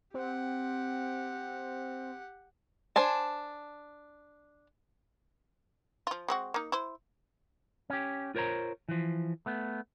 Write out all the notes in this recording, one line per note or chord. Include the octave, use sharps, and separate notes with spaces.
C4 G4 F#5
D4 C5 G#5 A5
F3 F4
G#3 C4 F#4
A#3 D#4
E4 C5
C#4 G4
F4 A#4 C5 C#5 A#5
E3 F3
A3 B3